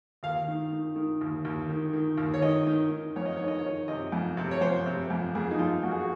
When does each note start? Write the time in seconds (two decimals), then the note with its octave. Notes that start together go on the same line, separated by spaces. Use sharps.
0.23 D#2 F5
0.48 D#3
0.72 D#3
0.96 D#3
1.21 D#2
1.45 D#2
1.70 D#3
1.93 D#3
2.17 D#2
2.34 C#5
2.42 D#3 D#5
2.67 D#3
2.90 D#3
3.16 F2 C#5
3.26 D#5
3.37 D#3 C#5
3.48 D#5
3.59 C#5
3.64 D#3
3.88 C3 D#5
4.12 F2
4.37 C3
4.51 C#5
4.61 F2 C5
4.86 C3
5.10 F2
5.35 F2 G#4
5.51 D#4
5.59 F2 F4
5.83 F2 F#4
5.91 G#4
5.99 F#4